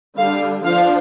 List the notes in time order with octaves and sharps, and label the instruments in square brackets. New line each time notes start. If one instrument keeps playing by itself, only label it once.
[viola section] D3 G3 D4 F5
F3 D4 F5